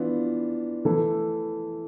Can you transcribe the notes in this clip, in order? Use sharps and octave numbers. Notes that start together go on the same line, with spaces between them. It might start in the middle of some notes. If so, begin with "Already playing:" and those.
Already playing: E3 B3 D4 F4
E3 A3 E4 A4